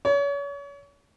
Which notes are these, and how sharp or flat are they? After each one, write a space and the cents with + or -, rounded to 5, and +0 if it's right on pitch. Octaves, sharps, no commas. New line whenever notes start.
C#5 +35